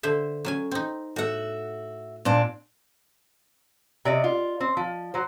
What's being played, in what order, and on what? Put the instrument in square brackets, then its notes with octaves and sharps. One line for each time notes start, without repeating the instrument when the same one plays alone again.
[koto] D3 C5 E5
F#3 C#4 G#5
C4 D#4
[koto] A2 F#5 [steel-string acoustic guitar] F#4 E5
[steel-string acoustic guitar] A#2 C4 D4
[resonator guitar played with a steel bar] C3 D5 D#5
F4
C4
F3
F#3 C5